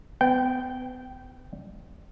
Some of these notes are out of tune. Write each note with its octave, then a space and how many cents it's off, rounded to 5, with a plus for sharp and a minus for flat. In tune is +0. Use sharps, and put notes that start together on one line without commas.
B3 +35 G5 -15